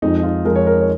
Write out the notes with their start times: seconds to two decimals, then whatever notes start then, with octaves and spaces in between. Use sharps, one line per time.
0.02 F2 F3 G#3 D#4
0.23 F4
0.44 F2 F3 G#3 A#4
0.56 C#5
0.67 A#4
0.81 C#5